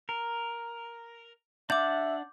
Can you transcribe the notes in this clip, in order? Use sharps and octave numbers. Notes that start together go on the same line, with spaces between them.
A#4
D4 E5 F#5 D6 G6